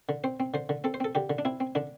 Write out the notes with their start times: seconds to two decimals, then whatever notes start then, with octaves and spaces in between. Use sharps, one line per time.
0.09 D3
0.24 C4 C5
0.40 C4
0.54 D3 C5
0.69 D3
0.84 C4 A4
0.94 C5
1.00 C4 A4
1.15 D3 G4
1.30 D3
1.38 D4
1.45 C4 E4
1.60 C4
1.75 D3 D4